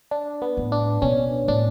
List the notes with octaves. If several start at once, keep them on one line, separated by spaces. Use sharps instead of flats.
D4
B3
A2
D4
B2 C#4
A2 D4